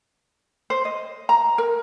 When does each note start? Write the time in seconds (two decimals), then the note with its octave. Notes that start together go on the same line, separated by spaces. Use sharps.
0.70 C5
0.85 D#5
1.29 A#5
1.58 A#4